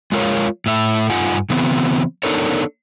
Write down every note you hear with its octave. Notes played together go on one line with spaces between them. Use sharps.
G#3 F4 A#4 C#5 F5
A2 E5
G2 D#4 F4 F#5 G#5
C#3 E3 B3 C4
B3 D4 D#4 A4 A#4 C#5